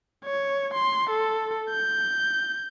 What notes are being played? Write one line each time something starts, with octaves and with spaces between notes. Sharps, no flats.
C#5
C6
A4
G6